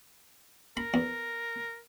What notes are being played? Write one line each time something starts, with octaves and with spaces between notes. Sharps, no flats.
A#4 B5
E2